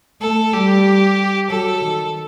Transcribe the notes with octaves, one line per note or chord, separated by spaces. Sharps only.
A3 A4
G3 G4
F#3 A4
D#3